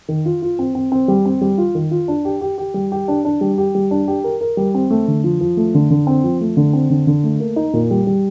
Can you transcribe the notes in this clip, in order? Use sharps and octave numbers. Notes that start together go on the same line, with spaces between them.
D#3
F4
F4
C4
C4
C4
G3
C4
G3
F4
D#3
F4
D4
G4
G4
G4
G3
G4
D4
D4
G3
G4
G3
D4
G4
A#4
A#4
G3
C4
A3
D3
F3
F3
A3
D3
D3
C4
F3
A3
D3
C4
D3
D3
A3
A#3
D#4
A#2
G3
G3